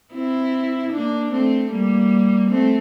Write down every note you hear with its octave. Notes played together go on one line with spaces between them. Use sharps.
C4 E4
A#3 D4
A3 C4
G3 A#3
A3 C4